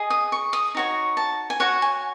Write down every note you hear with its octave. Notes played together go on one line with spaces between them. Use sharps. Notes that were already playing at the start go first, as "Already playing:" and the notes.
Already playing: G#4 D#5
D#6
C#6
D#6
D#4 F#4 C#5
A5
G#5
F#4 C#5 F#5
G#5